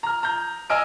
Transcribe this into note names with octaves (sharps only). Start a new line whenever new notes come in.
A#5 F6
A#5 G6
D#5 G#5 E6 F6 D7